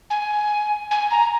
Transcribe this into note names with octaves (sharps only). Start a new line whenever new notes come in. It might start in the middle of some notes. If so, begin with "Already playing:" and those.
G#5
G#5
A#5